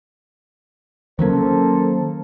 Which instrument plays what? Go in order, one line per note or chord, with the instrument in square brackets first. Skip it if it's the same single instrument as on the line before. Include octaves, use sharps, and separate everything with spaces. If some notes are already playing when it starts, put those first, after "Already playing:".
[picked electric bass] D#3 F#3 C#4 [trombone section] A#3 A4 C5